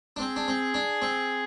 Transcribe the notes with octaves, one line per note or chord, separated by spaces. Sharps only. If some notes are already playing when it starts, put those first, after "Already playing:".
D4
C4 G#4
D4
C4
D4
C4